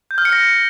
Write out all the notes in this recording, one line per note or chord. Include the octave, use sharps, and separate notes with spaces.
G6
F6
C#7
A#6